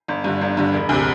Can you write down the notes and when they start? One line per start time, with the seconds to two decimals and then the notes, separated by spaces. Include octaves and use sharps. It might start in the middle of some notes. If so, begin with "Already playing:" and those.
0.08 G1
0.24 G2 D3
0.41 G1
0.57 G2 D3
0.73 E1
0.89 D2 C3